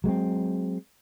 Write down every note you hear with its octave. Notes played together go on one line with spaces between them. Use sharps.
F#3 G#3 A#3 C4